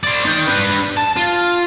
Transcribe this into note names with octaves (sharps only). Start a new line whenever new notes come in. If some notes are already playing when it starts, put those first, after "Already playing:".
C5 D5
D#4 G5
D4 B4
A5
F4